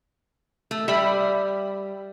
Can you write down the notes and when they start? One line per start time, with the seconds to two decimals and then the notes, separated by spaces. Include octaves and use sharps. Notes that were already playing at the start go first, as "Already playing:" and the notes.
0.71 A3
0.88 G3 E5 B5